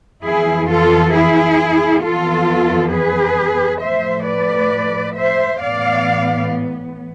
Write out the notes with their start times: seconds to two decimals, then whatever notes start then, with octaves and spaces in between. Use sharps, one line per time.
0.23 F2 E3 B3 E4 G#4
0.68 F4 A4
1.13 E4 G#4
2.02 F2 E3 B3 F4 A4
2.92 G#4 B4
3.81 A2 F3 A3 C5 E5
4.26 B4 D5
5.15 C5 E5
5.60 A2 E3 B3 D5 F5